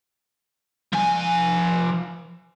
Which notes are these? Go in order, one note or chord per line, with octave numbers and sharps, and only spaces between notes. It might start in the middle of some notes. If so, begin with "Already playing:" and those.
F3 G#5